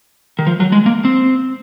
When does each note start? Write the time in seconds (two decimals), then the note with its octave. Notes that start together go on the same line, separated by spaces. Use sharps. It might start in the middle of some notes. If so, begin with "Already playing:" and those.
0.39 D#3
0.47 F3
0.60 F#3
0.72 G#3
0.86 A#3
1.05 C4